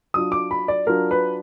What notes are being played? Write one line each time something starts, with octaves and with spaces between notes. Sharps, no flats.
F#3 D4 F4 D#6
D6
B5
D5
F#3 D4 F4 A#4
B4